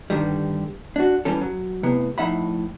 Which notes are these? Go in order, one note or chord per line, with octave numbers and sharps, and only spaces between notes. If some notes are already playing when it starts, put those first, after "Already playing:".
G2 D3 D#3 G3
D4 F#4
B1 E3 G3 C#4 A4
F#3
A2 C3 B3
A2 F3 D#4 E5 F#5 B5